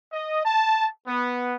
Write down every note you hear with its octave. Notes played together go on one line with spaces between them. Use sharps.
D#5
A5
B3